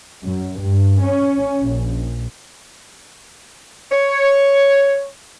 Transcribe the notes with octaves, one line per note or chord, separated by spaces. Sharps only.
F#2
G2
C#4
A#1
C#5